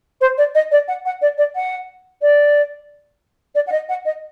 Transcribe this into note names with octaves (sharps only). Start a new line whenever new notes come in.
C5
D5
D#5
D5
F#5
F#5
D5
D5
F#5
D5
D5
F#5
D#5
F#5
D#5